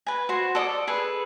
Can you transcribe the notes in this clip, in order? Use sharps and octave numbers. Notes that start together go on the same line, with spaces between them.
B4 G#5
F#4 C5
A4 D5 C#6 D#6
G#4 A4 B4